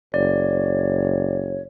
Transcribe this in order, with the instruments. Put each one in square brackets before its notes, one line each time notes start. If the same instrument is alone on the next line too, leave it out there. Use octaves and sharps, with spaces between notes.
[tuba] F#1 [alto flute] C#5 [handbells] D5